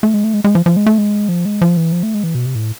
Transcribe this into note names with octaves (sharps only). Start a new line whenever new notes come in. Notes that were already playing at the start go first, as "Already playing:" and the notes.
A3
G#3
A3
G#3
G#3
F3
F3
G#3
A3
G#3
F3
G#3
F3
E3
F3
A3
G#3
E3
B2
C3
A2